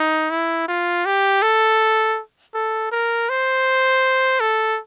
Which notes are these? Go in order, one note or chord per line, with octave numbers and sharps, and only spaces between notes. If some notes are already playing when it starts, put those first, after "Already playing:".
Already playing: D#4
E4
F4
G4
A4
A4
A#4
C5
A4